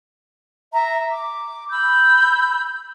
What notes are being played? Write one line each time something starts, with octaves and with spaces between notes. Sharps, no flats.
E5 A#5
D6
B5 E6 G6